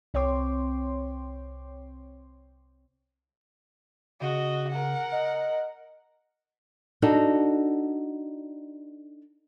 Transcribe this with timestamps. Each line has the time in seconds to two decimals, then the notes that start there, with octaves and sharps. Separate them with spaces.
0.14 C2 C4 C#5 G5 C6 D6
4.21 C#3 F#4 D#5
4.70 A#4 F#5
5.12 D#5
7.02 D4 D#4 F#4 A4